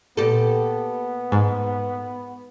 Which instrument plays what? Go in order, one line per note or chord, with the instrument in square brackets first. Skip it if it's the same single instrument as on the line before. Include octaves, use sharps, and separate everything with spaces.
[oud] A#2 G4 A4 [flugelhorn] B3
[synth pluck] G#2